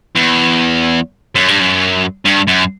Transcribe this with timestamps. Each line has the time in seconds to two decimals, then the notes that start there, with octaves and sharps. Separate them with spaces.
0.15 E2
1.35 F#2
1.48 G2
1.60 F#2
2.25 G2
2.47 F#2